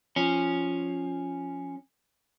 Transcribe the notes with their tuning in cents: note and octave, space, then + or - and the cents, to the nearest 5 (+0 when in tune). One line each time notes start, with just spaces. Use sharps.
F3 +0 C#4 +0